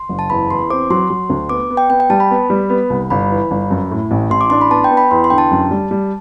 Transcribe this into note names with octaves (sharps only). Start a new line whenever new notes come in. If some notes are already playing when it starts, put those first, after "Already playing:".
Already playing: C6
F#1
A5
E2 B5
E2 C6
C4 D6
F#3 C6
F#3
D2
B3 D6
B3
G5
B3 G5
G5
G3 A5
B5
B3
G3
B3
C2
G1 B5
E3
G1
F#2
A2
A1
A1 C6
D6
D4 C6
B5
B3 A5
G5
B3
B5
E2 C6
C6
D3 G5
A5
F#2
G3
G3